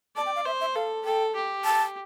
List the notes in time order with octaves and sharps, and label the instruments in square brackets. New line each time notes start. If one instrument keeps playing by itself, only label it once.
[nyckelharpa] D5 [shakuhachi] A5
[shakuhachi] G5
F5
[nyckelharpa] C5 [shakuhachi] E5
[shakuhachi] E5
[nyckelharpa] A4 [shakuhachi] F5
[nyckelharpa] A4 [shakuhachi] G5
[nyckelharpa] G4
[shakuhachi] A5